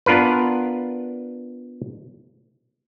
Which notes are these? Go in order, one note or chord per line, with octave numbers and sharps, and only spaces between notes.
B3 D4 F4 A#4 B4